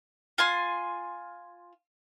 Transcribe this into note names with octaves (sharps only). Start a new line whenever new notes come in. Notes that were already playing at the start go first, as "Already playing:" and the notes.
F4 G#5 C6